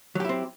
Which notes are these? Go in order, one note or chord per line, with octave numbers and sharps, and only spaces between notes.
F#3 C4 E4 G4